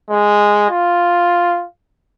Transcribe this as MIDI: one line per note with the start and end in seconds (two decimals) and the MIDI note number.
0.10 0.69 56
0.70 1.65 65